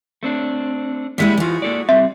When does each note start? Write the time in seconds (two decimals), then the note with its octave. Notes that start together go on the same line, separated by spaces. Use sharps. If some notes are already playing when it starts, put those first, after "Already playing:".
0.23 A3 C4 D4
1.18 G3 G#3 A#3 E4 E5 F#5
1.37 E3 F4 F#4 G#4
1.62 A#3 A4 D5
1.89 G3 C4 E5